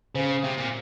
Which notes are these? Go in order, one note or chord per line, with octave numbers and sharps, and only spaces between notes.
C#3 C5
C3
A#2